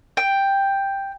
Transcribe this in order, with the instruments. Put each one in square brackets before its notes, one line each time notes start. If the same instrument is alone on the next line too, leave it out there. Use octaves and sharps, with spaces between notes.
[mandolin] G5